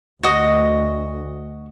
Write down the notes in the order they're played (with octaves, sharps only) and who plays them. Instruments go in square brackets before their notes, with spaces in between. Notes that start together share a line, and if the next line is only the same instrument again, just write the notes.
[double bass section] D2 [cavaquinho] F#4 D#5